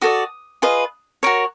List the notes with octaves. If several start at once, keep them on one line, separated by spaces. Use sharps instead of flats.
F#4 A4 D5 D#6
F4 G#4 B4 D#5
F#4 A#4 C#5